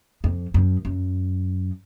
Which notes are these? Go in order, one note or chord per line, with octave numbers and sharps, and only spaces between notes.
F2
F#2
F#2